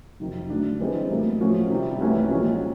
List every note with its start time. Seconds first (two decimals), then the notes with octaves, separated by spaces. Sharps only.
0.20 F2 C3 D#3 F#3
0.50 D3 F#3 A3 D4
0.80 E3 G3 C4 D#4 G#4
1.10 A2 F#3 A#3
1.41 F3 A3 C#4 F#4
1.71 C3 D#3 G3
2.01 C2 C3 E3 A3 C#4
2.31 A#2 F3 G#3 C#4 F#4